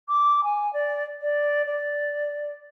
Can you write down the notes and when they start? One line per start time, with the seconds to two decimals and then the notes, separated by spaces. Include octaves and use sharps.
0.08 D6
0.44 G#5
0.73 D5
1.21 D5
1.65 D5